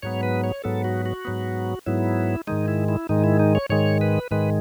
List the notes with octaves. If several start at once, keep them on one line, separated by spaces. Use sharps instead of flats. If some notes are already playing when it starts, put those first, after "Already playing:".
G#2 F#3 B3 C#5
B4
C#5
G#2 F#3 B3 A4
F#4
F#4
G#2 F#3 B3
G#2 F#3 B3 E4
G#2 D#3 G#3 D#4
E4
E4
G#2 D#3 G#3 D#4
E4
D#4
C#5
G#2 D#3 G#3 C#5
B4
G#2 D#3 G#3 B4